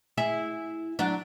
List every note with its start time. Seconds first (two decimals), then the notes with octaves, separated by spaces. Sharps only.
0.18 E4 G#4 E5
0.99 F#3 D4